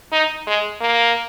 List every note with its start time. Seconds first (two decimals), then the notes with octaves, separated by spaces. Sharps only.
0.12 D#4
0.47 G#3
0.81 A#3